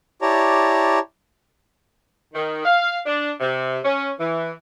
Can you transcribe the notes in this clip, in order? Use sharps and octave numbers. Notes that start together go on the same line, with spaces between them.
E4 G4 C#5 D5 A5 A#5
D#3
F5
D4
C3
C#4
E3